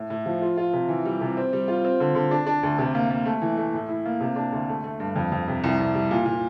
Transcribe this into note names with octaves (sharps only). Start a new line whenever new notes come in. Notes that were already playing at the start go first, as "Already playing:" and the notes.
Already playing: A2
A2
F3
F4
F4
C3
E3
G3
C3
C4
G3
F4
C4
D3
D3
D4
D4
D2
C3
A#3
A#3
A3
E3
A3
A2
E4
A#3
C3
D4
D2
A3
A3
G2
F2
F2
C3
C2
C2
G3
A#2
A#2